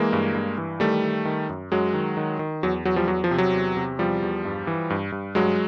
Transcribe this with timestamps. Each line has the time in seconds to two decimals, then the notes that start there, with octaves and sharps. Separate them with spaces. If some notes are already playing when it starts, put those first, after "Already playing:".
Already playing: E3 G#3 A#3
0.13 G2
0.35 G2
0.58 E3
0.80 D#3 G3 A3
1.03 D#3
1.25 D#3
1.49 F#2
1.72 F#2 F#3 G#3
1.94 D#3
2.17 D#3
2.39 D#3
2.63 E2 F#3
2.85 E2 F#3
2.96 F3 G3
3.08 E2 F#3
3.24 F3
3.31 C3
3.38 F#3
3.53 E2
3.77 C3
3.98 E2 F3 G3
4.22 E2
4.45 G2
4.67 E3
4.90 G2
5.12 G2
5.35 G2 F#3 G#3